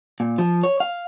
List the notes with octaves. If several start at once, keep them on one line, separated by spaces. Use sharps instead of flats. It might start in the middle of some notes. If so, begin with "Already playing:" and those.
A#2
F3
C#5
F5